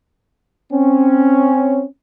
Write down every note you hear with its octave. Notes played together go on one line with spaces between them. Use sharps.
C4 C#4